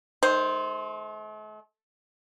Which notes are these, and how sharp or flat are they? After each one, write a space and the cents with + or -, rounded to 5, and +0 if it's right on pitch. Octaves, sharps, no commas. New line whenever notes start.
D#3 -15 A3 -45 C5 +0